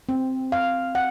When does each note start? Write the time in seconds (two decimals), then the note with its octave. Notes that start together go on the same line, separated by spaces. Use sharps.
0.09 C4
0.52 F5
0.95 F#5